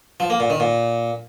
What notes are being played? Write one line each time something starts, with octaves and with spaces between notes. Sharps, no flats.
F3
A#3
A#2
D#3
A#2